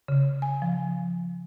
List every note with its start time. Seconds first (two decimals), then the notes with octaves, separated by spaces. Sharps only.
0.08 C#3
0.42 G#5
0.62 F3